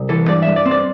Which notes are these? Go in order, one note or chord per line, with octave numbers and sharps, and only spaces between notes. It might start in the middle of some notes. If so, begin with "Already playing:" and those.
Already playing: C2
E3 A4
G2 D5
G2 E5
D5
C4
D5